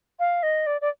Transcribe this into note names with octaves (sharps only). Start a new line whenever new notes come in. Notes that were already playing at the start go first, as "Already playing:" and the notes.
F5
D#5
D5
D5